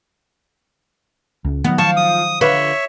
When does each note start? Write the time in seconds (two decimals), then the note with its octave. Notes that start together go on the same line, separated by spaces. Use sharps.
1.45 C#2
1.65 D#3 E3 F#3 B3
1.78 F3 A5 C#6
1.97 D#6
2.41 D3 F4 B4 C#5 E5